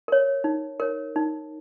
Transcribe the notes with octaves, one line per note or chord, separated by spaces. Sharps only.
A#4 C#5
D#4
A#4 C#5
D#4